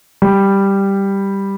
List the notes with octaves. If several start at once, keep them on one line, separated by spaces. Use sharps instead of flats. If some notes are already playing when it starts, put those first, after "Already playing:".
G3